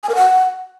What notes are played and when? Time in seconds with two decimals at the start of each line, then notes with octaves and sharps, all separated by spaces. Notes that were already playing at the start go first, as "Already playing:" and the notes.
0.03 G#5
0.09 A#4
0.15 F#5